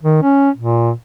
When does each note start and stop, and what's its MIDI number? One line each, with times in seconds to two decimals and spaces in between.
0.03 0.19 51
0.23 0.50 61
0.57 0.92 46